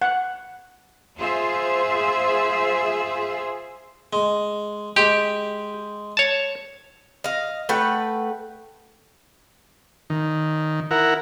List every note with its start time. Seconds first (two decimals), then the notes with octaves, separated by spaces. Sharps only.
0.02 F#5
1.20 F4 G#4 C5 E5
4.13 G#3
4.96 G#3 G4
6.17 C#5 A5
7.24 D#5 F5
7.69 A3 B4 F#5 G5
10.10 D#3
10.91 E4 A#4 F#5